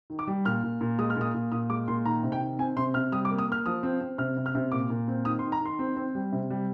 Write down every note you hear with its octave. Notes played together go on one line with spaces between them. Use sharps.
D#3
D6
G3
A#2 F6
A#2
A#2
G#3 D#6
F6
A#2 D#6
A#2
A#2 D#6
G#3 D6
A#2 C6
D#3 A#5
C3
G5
D#3
C4 G#5
C3 C6
C3 F6
G3 D#6
D6
A#3
D#6
A#3 F6
F3 D#6
C4
C4
C3 F6
C3
F6
C3
A#2 D6
A#2
C4
D#3 D#6
C6
D#3
A#5
D#3 C6
C4
C4
G3
C3
G3